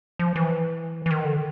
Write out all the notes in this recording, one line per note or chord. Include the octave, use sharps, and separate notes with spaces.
F3
E3
E3
D#3
D3